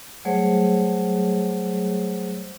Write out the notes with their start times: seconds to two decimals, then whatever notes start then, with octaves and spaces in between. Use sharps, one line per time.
0.25 F#3 G3 A3 G#4 C5 C#5